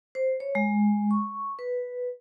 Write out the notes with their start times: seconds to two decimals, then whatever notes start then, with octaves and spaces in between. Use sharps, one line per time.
0.15 C5
0.40 C#5
0.55 G#3
1.11 C#6
1.59 B4